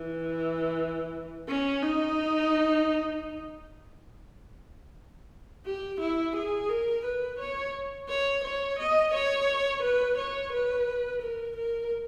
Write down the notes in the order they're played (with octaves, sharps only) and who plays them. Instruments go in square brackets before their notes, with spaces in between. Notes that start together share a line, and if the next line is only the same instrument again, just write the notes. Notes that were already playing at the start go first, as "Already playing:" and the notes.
Already playing: [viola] E3
C#4
D#4
G4
E4
G#4
A#4
B4
C#5
C#5
C#5
D#5
C#5
B4
C#5
B4
A#4
A#4